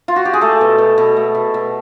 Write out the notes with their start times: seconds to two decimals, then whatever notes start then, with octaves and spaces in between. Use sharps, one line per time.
0.08 F4
0.16 F#4
0.25 G4
0.33 G#4
0.41 A3 A4
0.61 B2
0.78 B2
0.98 B2
1.16 A3
1.35 B2
1.54 B2